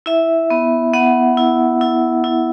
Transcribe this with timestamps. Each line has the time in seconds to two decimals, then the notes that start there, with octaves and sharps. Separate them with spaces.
0.06 E4 E5
0.50 B3
0.93 B3 F#5
1.37 E4
1.81 E4
2.24 E4